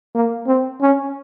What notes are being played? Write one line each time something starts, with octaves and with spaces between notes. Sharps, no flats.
A#3
C4
C#4